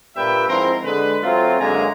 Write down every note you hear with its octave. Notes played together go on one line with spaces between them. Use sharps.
G2 A#2 A#3 B4 E5 G5
G#2 F3 C4 E4 A#4 C6
D3 G#3 B4
F#3 A3 C4 F4
F#2 D3 G#3 A#3 G#5 A#5